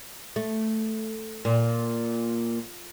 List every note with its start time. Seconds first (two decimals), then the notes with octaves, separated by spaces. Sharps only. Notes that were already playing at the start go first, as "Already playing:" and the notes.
0.36 A3
1.45 A#2